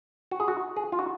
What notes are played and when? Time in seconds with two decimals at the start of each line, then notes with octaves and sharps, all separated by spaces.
0.31 F#4
0.40 G#4
0.48 F#4
0.76 G#4
0.92 F4
0.99 F#4